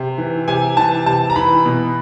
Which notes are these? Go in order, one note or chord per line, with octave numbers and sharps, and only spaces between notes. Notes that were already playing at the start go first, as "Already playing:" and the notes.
Already playing: C3
E3
C3 G#5
E3 A5
C3 A5
A#5
E3 B5
B2